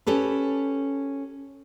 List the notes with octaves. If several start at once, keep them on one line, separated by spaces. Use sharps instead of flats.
C#4 G4 A4 B4